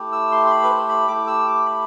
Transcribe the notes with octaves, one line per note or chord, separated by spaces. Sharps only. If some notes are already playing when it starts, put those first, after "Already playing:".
Already playing: A3 E4 G4
E6
C6
C6
B5
B4
C5
B5
A3 E4 G4 D6
E6
D6
B5